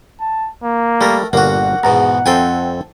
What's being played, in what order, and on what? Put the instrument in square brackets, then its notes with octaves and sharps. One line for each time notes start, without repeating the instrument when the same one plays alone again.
[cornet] A5
A#3
[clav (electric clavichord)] G3 [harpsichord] A3 A#4
[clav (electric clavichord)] G1 A#2 F5 [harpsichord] A#3 F#4 [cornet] F#5
[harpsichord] E2 G#2 B2 [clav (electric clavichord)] A#5
[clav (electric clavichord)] F2 C4 [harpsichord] A4 G5 G#5